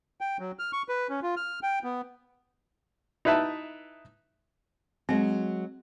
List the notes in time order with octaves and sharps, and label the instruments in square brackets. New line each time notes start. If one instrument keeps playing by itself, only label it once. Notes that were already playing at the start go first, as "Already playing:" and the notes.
[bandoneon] G5
F#3
F6
C#6
B4
C#4
F4
F6
G5
B3
[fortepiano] D#4 E4 B4 E5 A5
[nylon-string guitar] F#3 G#3 [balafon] C4